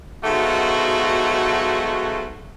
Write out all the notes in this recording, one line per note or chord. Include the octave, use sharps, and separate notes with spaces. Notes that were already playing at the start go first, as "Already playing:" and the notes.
G#2 B2 F#3 A3 F4 F#4